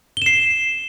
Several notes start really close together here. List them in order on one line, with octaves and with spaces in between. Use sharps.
G7 E7 C7